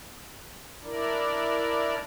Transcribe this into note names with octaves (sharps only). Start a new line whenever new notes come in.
D4 E4 A#4 D5